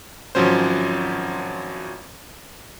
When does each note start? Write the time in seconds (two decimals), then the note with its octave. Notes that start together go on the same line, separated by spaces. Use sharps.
0.35 G#1 F3 F#3 C#4 C5